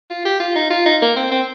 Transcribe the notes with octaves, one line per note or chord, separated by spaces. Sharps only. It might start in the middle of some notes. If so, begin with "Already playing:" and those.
F4
G4
F4
D#4
F4
D#4
A#3
C4
C4